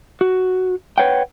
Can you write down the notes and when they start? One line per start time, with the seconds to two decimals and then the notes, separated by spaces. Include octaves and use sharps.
0.21 F#4
0.98 B4 C#5 F#5 G5